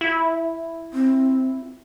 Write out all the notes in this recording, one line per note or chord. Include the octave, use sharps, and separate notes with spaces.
E4
C4